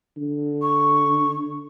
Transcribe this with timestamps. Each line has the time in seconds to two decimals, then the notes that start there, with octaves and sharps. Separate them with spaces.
0.17 D3
0.62 C#6